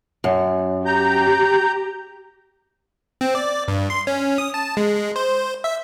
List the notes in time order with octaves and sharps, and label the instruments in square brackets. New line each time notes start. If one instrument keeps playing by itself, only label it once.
[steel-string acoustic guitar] F#2
[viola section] G4 [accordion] A#5 G6
[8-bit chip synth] C4
D5
G2
C6
C#4
D#6
A5
G#3
G#3
C5
E5